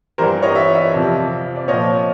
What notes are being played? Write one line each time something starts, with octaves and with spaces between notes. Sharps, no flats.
G2 E3 G3 A#4 C5
C#5 D#5
D5 E5
D5 E5
F2 C3 F3
D5
A#2 F3 C#5 D#5